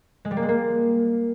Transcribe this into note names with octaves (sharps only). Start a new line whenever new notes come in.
G#3
G3
A#3
G#3
A#3